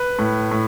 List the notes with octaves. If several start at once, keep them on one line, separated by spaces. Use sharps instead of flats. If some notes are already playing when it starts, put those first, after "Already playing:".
Already playing: B4
A2
A2